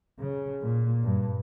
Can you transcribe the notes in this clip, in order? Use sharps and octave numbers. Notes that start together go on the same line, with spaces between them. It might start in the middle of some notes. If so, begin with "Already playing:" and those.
C#3
A#2
G2